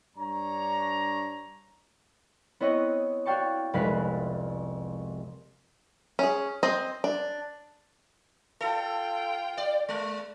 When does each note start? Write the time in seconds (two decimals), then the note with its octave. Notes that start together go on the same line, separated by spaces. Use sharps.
0.17 G2 D4 C#5 A#5
2.60 B3 C4 E4 B4 C#5 D#5
3.26 F#4 D5 F5 G5 A5 C#6
3.73 F1 C2 G#3 B4 F5 B6
6.19 C#4 G#4
6.63 C4 C5 D#5
7.04 D4
8.61 F4 A4 G5
9.57 D5
9.89 G#3